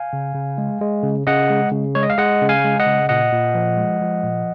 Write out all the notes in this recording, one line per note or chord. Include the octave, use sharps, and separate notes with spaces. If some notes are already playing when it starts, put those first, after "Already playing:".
Already playing: F5 G#5
C#3
C#3
G#3
G#3
C#3
C#3 D#5 F#5
G#3
C#3
G#3 C#5
D#5
F5
G#3 D#5 F#5
C#3
F5 G#5
G#3
D#5 F#5
C#3
A#2 D#5 F#5
A#2
F3
G#3
F3
A#2